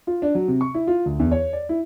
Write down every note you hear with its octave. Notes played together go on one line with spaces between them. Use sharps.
F4
D4
F#3
C3
C#6
E4
F4
D2
E2
C#5
D5
E4